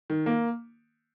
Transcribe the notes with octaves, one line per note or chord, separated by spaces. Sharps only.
D#3
A#3